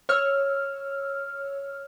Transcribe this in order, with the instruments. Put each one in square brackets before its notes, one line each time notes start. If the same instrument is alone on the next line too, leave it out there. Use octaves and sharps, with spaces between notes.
[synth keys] C#5 E6 F6